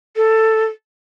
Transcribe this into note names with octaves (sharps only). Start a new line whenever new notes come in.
A4